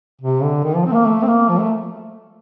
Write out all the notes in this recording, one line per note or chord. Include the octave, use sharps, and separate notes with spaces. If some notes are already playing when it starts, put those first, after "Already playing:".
C3
D3
D#3
F3
C4
A3
A#3
A3
C4
A#3
F3
A3